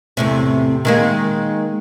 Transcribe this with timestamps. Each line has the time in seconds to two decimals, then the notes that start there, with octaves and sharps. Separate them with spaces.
0.17 E2 A2 C3
0.85 D#3 G#3 A#3